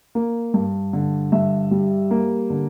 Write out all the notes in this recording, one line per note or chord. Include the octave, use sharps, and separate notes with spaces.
A#3
G2
D3
G2 E5
G3
A#3
D3